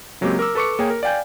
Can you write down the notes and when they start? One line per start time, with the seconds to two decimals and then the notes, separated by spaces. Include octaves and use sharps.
0.21 C#3 F#3 G#3 A#3 C4 G4
0.39 A#4 D6 E6
0.55 A4 B4 C#6 D6 C#7
0.79 A#3 G#4 C#5 G5
0.90 A#4
1.03 D5 F5 G5 G#5 G6